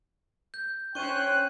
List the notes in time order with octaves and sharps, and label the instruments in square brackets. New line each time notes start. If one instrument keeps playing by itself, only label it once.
[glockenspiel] G6
[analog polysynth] C#4 C5 C#5 [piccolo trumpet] G5 [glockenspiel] C#6 D#7 [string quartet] F#6